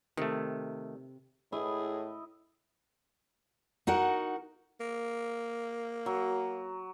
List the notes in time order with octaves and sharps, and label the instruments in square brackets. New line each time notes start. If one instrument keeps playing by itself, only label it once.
[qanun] C3 [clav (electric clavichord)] D#3 A3
[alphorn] A2 [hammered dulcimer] E4 D#5 [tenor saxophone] G#4
[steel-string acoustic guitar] D#4 F#4 A#4 F#5
[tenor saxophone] A#3
[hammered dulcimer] F#3